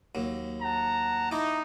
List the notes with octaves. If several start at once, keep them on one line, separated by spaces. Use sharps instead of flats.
D#2 F#3
F#5 A5 A#5
D#4 E4 D6